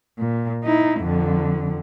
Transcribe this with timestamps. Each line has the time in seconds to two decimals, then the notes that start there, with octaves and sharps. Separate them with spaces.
0.18 A#2
0.63 D#4 E4
1.00 F2 D3